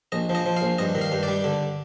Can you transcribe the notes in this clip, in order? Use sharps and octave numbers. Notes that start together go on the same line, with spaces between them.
A#1 D#5
F3
D#5
F3
F5
A#1
G2 D#5
D#3
F5
G2
D5
G3
D3